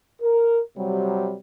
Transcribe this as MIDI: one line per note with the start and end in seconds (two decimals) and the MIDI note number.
0.22 0.60 70
0.78 1.36 48
0.78 1.36 54
0.78 1.36 55